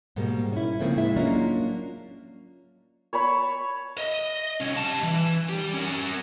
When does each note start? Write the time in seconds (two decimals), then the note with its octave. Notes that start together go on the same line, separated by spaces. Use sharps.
0.16 G#2 B2 G3 A#3
0.53 C#4 E4
0.80 C#3 F3 A3 A#3 C4
0.97 D2 A2 G#3 E4 E5
1.16 F#3 A#3 C#4 D4 F4 D#5
3.13 C#5 A5 B5 C#6
3.98 D#5
4.60 C2 C#4
4.77 G3 A5
5.03 E3
5.49 G3 G4
5.74 C#4 A#4